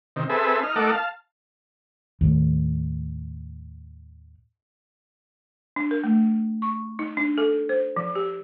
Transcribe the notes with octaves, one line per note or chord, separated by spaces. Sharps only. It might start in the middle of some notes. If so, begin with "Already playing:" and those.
C3 D#3
C4 G#4 A4 B4 E5
D#4 F6
A3 D#4 A4 A#4 F#5 D6
F5 A5
D#2 A2
D4
A#4
A3
C#6
D#4
D4
A4
C5
F3
G4